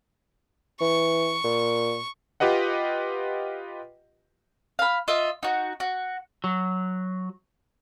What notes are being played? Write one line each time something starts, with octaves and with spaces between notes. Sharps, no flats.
E3 C#6
A#2
F4 G4 B4 D#5 F#5
F5 B5
F4 D#5 E5
D#4 F#4
F#4
F#3